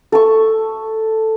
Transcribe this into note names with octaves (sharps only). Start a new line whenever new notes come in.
A4 C#6